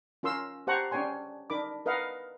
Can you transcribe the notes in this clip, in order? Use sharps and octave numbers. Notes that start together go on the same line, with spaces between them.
C#4 F4 A#4 C6 E6
G4 C5 F#5 A5 A#5 C#6
C#4 D4 C#5 G5 G#5 C6
D4 D#4 A#4 B5 D6
A#4 B4 D#5 F5 F#5